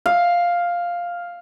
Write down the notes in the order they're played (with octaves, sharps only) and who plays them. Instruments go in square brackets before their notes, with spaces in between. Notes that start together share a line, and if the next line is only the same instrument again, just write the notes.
[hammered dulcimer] F5